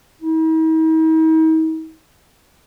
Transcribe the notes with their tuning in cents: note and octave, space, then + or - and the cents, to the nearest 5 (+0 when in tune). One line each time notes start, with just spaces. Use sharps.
D#4 +45